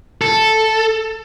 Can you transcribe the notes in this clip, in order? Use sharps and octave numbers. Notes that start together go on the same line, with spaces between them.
A4